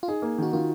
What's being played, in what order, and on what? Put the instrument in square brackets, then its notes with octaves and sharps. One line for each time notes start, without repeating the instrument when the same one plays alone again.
[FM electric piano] F4
[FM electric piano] D#4 [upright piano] G#4
[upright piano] A#3
[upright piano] D#3 [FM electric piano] F#4
[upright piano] D#3 [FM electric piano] F4